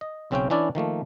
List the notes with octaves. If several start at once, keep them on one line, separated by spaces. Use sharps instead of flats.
D#5
B1 C#3 C4 C#4 C5 G5
E3 C#4 D4 E4 D5
D#3 F3 A3 A#3